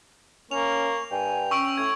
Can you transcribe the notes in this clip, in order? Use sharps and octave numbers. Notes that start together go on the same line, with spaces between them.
A#3 C#4 C#6 F7
G2 G5 G#5
C#4 C#6 E6 D7
A2 G#6